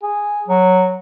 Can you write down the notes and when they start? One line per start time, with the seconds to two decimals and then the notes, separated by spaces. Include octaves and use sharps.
0.03 G#4
0.48 F#3